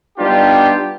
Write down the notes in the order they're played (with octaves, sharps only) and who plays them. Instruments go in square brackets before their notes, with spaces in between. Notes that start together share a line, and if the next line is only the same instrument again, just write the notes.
[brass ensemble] G3 B3 D4 D#4 F4 G4